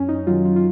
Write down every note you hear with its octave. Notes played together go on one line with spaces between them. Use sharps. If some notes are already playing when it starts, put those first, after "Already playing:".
Already playing: F#2 C#4
D#4
D#3 F#3 F4
F4
F4